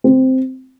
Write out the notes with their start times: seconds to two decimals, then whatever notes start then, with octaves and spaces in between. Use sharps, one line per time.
0.04 C4